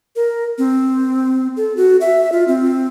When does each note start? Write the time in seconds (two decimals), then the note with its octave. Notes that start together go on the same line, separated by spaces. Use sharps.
0.16 A#4
0.58 C4
1.57 A4
1.77 F#4
2.01 E5
2.32 F4
2.48 C4